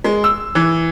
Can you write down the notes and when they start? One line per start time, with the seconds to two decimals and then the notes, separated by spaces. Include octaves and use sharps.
0.04 G#3
0.24 E6
0.55 E3